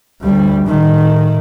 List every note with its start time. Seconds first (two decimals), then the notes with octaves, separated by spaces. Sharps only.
0.22 D2 G3
0.67 A2 D#3